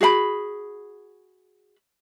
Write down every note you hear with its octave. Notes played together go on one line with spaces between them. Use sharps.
F#4 G#4 F5 B5